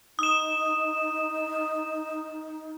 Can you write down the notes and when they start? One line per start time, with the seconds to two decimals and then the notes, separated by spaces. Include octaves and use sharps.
0.19 D#4 D#6 E7